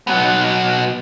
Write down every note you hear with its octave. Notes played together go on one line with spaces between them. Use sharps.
F#3 B3